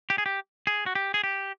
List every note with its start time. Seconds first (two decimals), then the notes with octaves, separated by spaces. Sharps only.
0.10 G4
0.18 G#4
0.26 G4
0.67 G#4
0.86 F#4
0.95 G4
1.14 G#4
1.24 G4